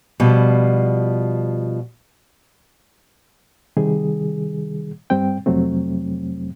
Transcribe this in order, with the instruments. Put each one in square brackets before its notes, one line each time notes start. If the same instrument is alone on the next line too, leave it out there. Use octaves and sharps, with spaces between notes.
[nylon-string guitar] B2 F3 G3
[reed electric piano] C3 D#3 G3 G#4
G2 G3 C4 G5
F2 C3 F#3 A3 C4